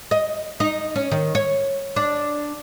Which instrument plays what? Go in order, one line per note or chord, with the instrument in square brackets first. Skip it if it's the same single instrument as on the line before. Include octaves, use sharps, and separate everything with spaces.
[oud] D#5
D#4
C#4
D#3
C#5
D4